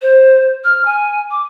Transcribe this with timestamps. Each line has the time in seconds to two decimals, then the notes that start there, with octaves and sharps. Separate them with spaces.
0.02 C5
0.64 F6
0.86 G#5
1.31 D6